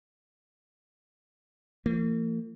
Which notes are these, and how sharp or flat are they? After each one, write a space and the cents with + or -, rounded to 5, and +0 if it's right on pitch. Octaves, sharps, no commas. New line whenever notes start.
E3 +45 A#3 -45